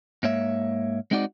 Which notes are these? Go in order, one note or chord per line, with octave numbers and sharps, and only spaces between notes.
G#2 A#3 C#5 E5
G#3 C4 D#4 F#4 D5